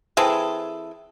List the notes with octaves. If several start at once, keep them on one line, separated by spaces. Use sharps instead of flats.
E3 C4 G#4 A4